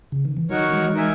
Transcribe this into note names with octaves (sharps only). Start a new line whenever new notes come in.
C#3
D#3
E3
D#3 F#3 D#4 F#4 A#4 C#5
E3 G#3
D#4 A#4 E5 G#5